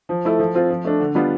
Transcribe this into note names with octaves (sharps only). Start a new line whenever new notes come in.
F3
A3 E4 A4
F3
C4 F4
F3
A3 D4
D3
G3 B3 D4 F4